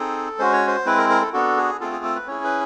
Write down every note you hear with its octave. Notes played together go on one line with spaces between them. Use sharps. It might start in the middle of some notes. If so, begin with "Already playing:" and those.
Already playing: C4 D#4 G#4 A4
G#3 C#4 F#4 C5
C#5
C5
G#3 C4 E4 B4
A#4
A#4
A4
B3 D4 F#4 A4
G#4
A3 C4 F4 G#4 A4
G#4
A4
B4
C#4 E4 G#4 C#5
B4